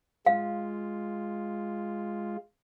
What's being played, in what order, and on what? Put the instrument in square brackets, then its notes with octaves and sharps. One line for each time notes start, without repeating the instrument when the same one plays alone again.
[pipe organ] G#3 F4 [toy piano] F5